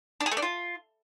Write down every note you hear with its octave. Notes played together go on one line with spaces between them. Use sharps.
D4
G#4
A3
D4
F4